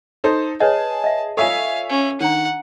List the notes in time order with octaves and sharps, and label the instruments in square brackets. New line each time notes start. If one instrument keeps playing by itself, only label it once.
[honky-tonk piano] D#4 A4 C5
[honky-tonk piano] G#4 [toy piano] B4 C#5 D#5 [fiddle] A5
[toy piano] D#5 E5
[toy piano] F4 A4 [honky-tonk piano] C#5 E5 G#5 [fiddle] F5
[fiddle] C#4
[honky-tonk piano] D#3 [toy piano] D4 A#5 [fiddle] F#5